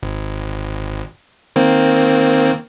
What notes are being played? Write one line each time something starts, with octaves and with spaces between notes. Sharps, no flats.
G#1
D#3 A#3 C4